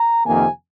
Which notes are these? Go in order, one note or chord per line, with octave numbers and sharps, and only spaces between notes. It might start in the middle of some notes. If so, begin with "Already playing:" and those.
Already playing: A#5
F2 C3 D#3 A#3 G#5